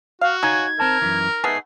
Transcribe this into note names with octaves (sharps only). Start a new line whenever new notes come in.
F#4 F5
D#4 C#5 F5 G#5 G#6
C4 A#4 C5 A5
F#2 E3
A3 B3 D#4 G#4 C7